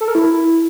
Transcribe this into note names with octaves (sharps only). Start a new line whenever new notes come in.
A4
A#4
E4